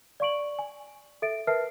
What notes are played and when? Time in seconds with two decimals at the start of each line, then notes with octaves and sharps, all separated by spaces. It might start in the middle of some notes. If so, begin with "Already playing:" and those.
0.20 D5 F5 C#6 D7 F#7
0.59 G#5
1.22 A4 E5 A6 D7
1.47 A#4 B4 E5 A5 F6 C7